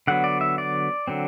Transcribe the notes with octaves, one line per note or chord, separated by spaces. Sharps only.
D3 F#3 B3 F#5
D5
E5
D5
D3 F#3 C4